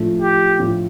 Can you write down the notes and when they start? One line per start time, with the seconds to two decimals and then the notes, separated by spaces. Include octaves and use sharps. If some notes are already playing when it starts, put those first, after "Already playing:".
Already playing: A2 F3 A3 D4 F4
0.21 G4
0.59 A2 F3 A3 D4 F4